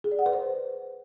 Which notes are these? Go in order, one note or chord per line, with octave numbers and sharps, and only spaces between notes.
G#4
D5
F#5
B4
C5